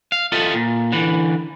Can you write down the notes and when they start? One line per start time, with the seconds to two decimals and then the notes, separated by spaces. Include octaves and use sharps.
0.12 F5
0.32 F4 A4 D#5 E5
0.54 A#2
0.92 D3 E3